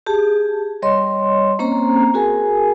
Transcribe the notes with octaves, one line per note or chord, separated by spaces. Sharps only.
G4 G#4 A5
G3 C#5 D#5 C6
A#3 C4 C#4 C5 A#5
F#4 G#4 A#4 G#5